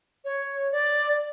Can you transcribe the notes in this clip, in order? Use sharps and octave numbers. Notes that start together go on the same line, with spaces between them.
C#5
D5